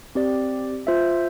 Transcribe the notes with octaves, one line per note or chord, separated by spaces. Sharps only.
C4 G4 D5
F4 C5 E5